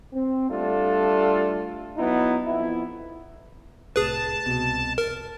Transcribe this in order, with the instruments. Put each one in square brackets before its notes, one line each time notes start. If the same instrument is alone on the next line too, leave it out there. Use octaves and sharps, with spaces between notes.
[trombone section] C4
G3 A3 D4 F4 A4
F#3 B3 D#4 E4
F2 B3 E4
[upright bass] C2 A2 [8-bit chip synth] G#4 B4 [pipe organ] A5
[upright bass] C2 B2
[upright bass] F2 [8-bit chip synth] A#4